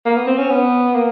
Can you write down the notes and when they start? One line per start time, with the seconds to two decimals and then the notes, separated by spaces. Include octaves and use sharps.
0.05 A#3
0.16 B3
0.27 C4
0.38 C#4
0.50 B3
0.95 A#3